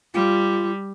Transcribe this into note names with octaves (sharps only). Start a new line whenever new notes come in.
G3 F4